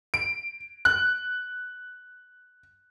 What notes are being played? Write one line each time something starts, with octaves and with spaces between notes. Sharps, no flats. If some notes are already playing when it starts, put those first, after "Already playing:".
D7
F#6